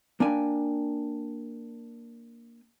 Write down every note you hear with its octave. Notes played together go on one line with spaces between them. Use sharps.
A#3 D4 G5 G#5